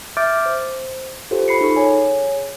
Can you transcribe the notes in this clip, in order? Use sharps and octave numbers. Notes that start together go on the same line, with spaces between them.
E5 D6 F6 G6 A6 D7
C5
F4 G4 A4 C5
B5 C7 C#7
D#4 G#4 A4 C#6
G#4 C#5 G#5